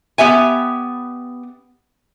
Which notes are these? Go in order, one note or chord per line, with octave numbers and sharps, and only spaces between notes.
B3 G4 E5 G#5